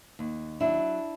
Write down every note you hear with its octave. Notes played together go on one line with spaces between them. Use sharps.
D#2
F#3 D4 E4